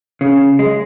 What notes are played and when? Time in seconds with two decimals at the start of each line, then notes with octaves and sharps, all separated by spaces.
0.21 C#3
0.59 G#3